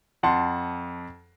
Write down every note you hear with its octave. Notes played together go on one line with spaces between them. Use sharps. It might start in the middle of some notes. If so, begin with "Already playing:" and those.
F2 F#5 A5 C6